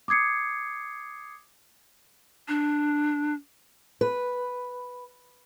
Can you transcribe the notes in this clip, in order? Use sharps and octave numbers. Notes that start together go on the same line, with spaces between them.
D6 D#6 G#6 C7 C#7
D4
B4